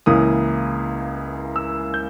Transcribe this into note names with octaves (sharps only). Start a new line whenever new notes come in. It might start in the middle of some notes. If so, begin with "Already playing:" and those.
C#2 C#3 E3 A#3 E4 D#6
E6
G6